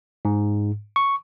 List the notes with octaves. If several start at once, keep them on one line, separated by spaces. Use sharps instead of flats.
G#2
C#6